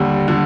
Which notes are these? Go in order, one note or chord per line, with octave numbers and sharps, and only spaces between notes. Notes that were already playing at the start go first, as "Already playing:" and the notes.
Already playing: D#2 D3 G3
D3 G3